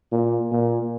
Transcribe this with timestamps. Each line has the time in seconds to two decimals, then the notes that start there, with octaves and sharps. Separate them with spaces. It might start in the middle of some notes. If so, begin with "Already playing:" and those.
0.12 A#2
0.51 A#2